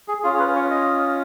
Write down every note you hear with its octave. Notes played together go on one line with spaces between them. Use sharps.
G#4
C#4 F4 G#4
C#5
B4
C#5
D#5